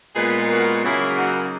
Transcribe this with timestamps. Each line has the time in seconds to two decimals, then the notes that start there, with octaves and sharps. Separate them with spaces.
0.15 A#2 G#3 B3 G#4 B4
0.49 F#4 A#4
0.83 C#3 F#3 A#3 E4 G#4
1.17 D#4 F#4